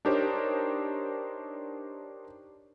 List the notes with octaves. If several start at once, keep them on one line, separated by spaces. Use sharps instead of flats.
D4 D#4 G4 A#4 C5 C#5